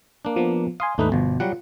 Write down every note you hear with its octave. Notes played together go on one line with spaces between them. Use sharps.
A#3 D4
F3 B3
F5 G#5 C6 D#6
D#2 G#2 A3 D4 D#4 B4
G1 B2 F3
F#3 G3 F4 F#5